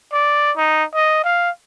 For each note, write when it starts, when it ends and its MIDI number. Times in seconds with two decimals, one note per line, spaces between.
0.13 0.52 74
0.57 0.84 63
0.95 1.24 75
1.24 1.50 77